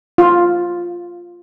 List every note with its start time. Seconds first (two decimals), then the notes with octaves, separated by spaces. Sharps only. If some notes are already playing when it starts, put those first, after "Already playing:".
0.18 F4